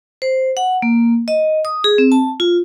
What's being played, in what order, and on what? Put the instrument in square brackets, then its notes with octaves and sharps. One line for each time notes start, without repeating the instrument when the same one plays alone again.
[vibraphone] C5
F#5
A#3
D#5
D#6
G#4
C4
A5
F4